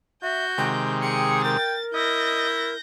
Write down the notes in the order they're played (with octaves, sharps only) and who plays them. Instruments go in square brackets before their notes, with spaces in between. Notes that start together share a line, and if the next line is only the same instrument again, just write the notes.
[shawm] F#4 [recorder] E5 [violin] G6
[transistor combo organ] C3 D#3 G#3 [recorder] G5
[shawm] G#4 [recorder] G5 [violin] C#7
[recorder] A#4 [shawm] G5 [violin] A6
[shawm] E4 [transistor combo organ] D#5 [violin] G6 A#6